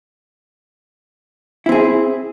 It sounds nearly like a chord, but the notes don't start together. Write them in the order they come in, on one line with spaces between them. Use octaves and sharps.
E4 C4 G#4